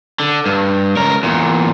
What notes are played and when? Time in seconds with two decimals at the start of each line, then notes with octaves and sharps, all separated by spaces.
0.20 D3
0.46 G2
0.97 C#2 A#4
1.23 E2 A#2